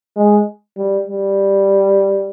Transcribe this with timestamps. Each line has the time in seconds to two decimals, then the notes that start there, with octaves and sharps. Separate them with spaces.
0.17 G#3
0.77 G3
1.07 G3